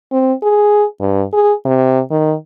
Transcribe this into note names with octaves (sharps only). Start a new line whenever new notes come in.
C4
G#4
G2
G#4
C3
D#3